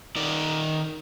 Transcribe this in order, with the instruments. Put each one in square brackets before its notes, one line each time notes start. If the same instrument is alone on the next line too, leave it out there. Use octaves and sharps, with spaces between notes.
[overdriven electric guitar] D#3 D5